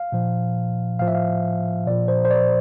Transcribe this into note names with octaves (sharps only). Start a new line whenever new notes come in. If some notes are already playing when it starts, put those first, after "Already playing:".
Already playing: F5
A#2 F3
A2 F3 F5
E5
F5
A#2 F3 D5
C5
C5
D5